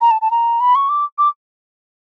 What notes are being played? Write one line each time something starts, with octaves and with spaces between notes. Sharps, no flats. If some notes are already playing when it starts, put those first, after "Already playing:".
A#5
A5
A5
A#5
B5
C#6
D6
D6